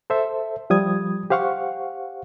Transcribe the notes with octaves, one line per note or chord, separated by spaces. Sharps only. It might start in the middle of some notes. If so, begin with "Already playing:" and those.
A4 C5 E5
F3 G3 D#6 G#6
G4 C5 F5 F#5 C#6